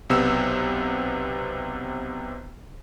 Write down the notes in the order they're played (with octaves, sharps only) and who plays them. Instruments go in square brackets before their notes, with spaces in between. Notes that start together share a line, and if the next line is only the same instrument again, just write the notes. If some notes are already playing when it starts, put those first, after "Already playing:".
[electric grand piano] B1 C3 B3 E6